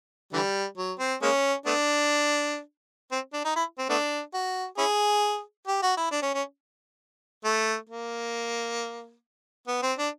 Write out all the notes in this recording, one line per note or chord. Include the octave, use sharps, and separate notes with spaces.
D3 E3 G3
F#3
C4
G#3 A#3 C#4
A3 B3 D4
C4
D4
D#4
E4
C4
A3 B3 D4
F#4
C#4 E4 G#4
G4
F#4
E4
D4
C#4
C#4
A3
A#3
B3
C4
D4